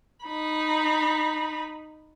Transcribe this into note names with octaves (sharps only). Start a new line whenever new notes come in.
D#4 B5